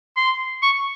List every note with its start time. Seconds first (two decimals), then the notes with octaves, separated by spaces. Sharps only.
0.17 C6
0.62 C#6